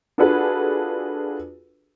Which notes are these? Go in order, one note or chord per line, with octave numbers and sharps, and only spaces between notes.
D4 F4 F#4 G#4 A4 B4